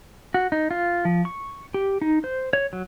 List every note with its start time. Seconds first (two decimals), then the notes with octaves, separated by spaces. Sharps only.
0.34 F#4
0.52 D#4
0.71 F4
1.05 F3
1.25 C#6
1.74 G4
2.02 D#4
2.24 C5
2.53 C#5
2.73 F#3